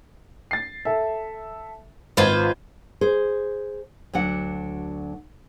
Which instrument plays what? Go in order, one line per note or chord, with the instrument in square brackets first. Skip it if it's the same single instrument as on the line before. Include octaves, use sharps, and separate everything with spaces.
[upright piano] A6 C7
A4 E5
[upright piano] G#1 G#6 [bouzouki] F4 B4 C5
[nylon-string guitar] G#4 C5
D2 F#3 D4 F#5